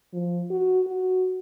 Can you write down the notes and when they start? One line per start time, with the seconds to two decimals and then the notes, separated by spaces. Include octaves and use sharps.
0.13 F3
0.50 F#4
0.87 F#4